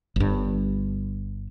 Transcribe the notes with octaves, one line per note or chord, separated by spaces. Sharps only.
G1 G2